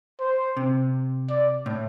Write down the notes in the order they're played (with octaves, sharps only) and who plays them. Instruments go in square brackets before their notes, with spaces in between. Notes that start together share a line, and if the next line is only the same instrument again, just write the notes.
[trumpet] C5
[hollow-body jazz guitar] C3
[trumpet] D5
[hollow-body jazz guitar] A2